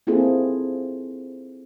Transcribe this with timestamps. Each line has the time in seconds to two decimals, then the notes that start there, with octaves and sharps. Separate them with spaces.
0.07 A#3 C4 E4 F4 G#4 A4